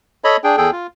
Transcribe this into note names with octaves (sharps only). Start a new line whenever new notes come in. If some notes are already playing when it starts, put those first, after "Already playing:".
A4 C#5 D#5 B5
D4 G#4 G5
E2 G#4 A4 G5
F4